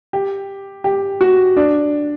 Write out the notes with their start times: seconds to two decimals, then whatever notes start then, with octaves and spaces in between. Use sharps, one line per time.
0.13 G4
0.84 G4
1.21 F#4
1.57 D4